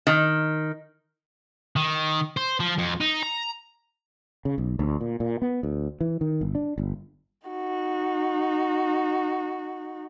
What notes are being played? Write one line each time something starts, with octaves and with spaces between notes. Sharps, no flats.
D#3
D#3
C5
F3
F2
D#4
A#5
C#3
B1
D2
A#2
A#2
B3
D2
E3
D#3
G1
D4
G1
D#4 F#4